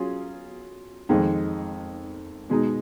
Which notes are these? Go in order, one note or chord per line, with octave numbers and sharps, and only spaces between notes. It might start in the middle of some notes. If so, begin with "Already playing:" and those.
Already playing: F#3 C#4 F4 G#4
F2 D#3 G#3 D#4
B2 G#3 D#4